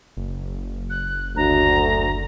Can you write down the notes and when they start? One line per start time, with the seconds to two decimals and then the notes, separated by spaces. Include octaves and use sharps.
0.17 F#1
0.90 F#6
1.36 D2 A#5